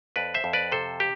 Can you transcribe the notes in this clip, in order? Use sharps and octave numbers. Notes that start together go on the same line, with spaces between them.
F2 B4 D5
C5 E5
F2
B4 D5
C3 A4 C5
G4